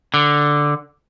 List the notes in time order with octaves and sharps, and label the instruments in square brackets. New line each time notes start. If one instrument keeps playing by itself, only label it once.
[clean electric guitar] D3